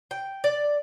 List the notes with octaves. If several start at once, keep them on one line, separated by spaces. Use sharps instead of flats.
G5
D5